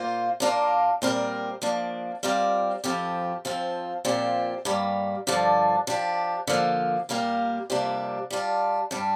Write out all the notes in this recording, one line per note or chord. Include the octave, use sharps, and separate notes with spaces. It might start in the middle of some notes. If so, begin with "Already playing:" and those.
Already playing: A#2 A#3 F4 C5
A#2 A#3 D4 F4 A#4
A#2 G3 C4 A#4
F3 A#3 D4
G3 C4 F4 A#4 D5
F2 F3 C4 G4
F2 F3 C4
A#2 F3 C4 G4
G2 G3 A#3
G2 D3 F3 D4
F3 D4 G4
D3 F3 A#3
A#2 G3 A#3 G4 A#4
F2 C3 G3 A#3 D4
G3 D4 F4
G2 G3 D4